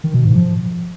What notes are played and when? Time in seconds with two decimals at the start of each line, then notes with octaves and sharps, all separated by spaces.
0.04 D#3
0.14 B2
0.25 G#2
0.35 F3